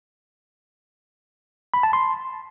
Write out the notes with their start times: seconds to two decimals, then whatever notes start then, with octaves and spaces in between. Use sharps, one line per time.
1.74 B5
1.83 A5
1.93 C6